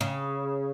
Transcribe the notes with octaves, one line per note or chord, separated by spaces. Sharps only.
C#3